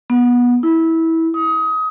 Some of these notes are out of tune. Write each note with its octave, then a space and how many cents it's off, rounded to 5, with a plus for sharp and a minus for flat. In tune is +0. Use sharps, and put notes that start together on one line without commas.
B3 -20
E4 -20
D#6 +25